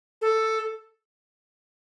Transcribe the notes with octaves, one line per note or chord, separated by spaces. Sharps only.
A4